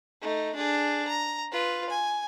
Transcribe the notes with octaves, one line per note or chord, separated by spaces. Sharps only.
A3 D#4
D4 G#4
A#5
F4 B4
G#5